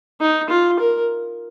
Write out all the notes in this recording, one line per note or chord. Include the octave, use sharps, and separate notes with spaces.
D#4
F4
A#4